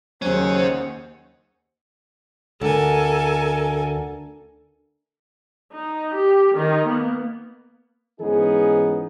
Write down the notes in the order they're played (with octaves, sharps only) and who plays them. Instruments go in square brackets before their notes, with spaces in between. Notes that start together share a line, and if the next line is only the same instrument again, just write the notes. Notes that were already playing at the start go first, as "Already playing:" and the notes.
[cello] D#2 F#5 [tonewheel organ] F#3 [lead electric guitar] C#4 G#4 [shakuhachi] C5
[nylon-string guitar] D2 [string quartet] A4 A#4 G#5
[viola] D#4
G4
D#3 D#4
A#3 B3
[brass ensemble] G#2 E3 B3 C#4 D#4 G#4